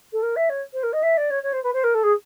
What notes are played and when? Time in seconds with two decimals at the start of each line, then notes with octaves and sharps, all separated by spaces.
0.12 A4
0.22 A#4
0.36 E5
0.49 C#5
0.73 C5
0.83 A#4
0.92 D#5
1.02 E5
1.17 D5
1.30 C#5
1.43 C#5
1.52 C5
1.63 B4
1.73 C5
1.83 A#4
1.94 A4
2.03 G#4